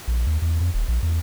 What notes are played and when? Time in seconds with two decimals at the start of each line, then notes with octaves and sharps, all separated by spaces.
0.08 A#1
0.26 D#2
0.42 E2
0.60 F2
0.74 D#1
0.88 A#1
1.03 E2